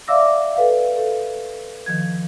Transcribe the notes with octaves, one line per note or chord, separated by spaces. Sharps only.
D5 E5 F5 D6 E6 A#6
A4 B4 F5
A4
D#3 F3 G#6